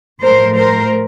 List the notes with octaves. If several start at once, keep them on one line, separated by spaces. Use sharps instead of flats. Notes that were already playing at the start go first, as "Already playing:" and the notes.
A2 F3 A3 A#4 C5
A#4 C5